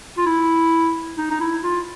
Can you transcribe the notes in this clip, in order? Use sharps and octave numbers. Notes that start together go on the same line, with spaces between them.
F4
E4
D#4
D#4
E4
F4